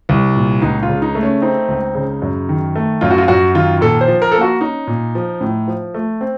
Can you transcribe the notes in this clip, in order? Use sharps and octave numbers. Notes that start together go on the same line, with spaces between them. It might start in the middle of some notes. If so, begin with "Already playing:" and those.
C2
A#2
C#2 D#4
F4
C#3
D#4
A3
C#4
C4 D#4
C#2
C#3
F#2
D#3
A3
F#2 F4
F#4
F4
F#2 F#4
D#3 F4
A#2 A4
C5
F3
A#4
A#3 A4
F#4
C#4 D#4
A#2
F3
A2
F3
A3
C4